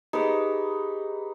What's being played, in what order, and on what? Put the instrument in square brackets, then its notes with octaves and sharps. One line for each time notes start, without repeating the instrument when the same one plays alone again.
[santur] D#4 B4 [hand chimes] G4 G#4